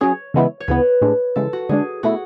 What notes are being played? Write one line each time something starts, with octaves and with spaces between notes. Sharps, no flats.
F#3 C#4 G#4 C#5
C#3 E3 G#3 B3 E4
C#5
D2 C#3 E3 B3 B4
A2 G#3 D4
C#3 E3 G#3 A4
F#4
D3 G#3 D4 G#4
B2 A3 E4 F#4